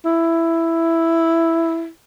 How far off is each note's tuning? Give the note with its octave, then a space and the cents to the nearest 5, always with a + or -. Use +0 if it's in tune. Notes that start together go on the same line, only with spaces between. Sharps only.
E4 +5